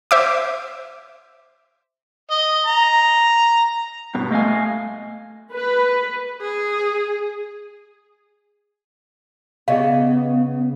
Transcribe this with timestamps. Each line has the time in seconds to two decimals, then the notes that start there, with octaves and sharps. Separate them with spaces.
0.11 C5 E5 D6
2.31 D#5
2.66 A#5
4.15 G2 B2
4.31 A3 D#5 F5 G#5
5.53 B4
6.41 G#4
9.68 C#3 B3 G#4 D#5 F5